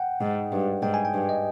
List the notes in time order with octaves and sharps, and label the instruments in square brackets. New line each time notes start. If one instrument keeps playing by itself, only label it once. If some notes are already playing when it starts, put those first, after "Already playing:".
Already playing: [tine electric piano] F#5 G5
[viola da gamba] G#2
G2
[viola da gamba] G#2 [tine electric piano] G5
[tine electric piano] G#5
G5
[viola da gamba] G2
[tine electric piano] D#5